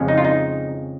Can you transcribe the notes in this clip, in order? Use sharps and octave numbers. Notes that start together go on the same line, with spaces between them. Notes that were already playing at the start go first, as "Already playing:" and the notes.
Already playing: F2 C#3 F3 G#3 C#4
D#4
F4
D#4